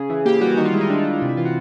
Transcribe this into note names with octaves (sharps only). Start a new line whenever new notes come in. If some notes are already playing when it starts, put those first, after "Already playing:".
Already playing: C#3 G#4
E3
A#3 G4
G3 F#4
D#3 F#4
F4
G#3 E4
D#4
G#3 D4
D#3
C3 D4
E4
E3 F4
F#4